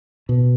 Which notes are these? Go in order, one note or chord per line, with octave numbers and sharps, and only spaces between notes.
B2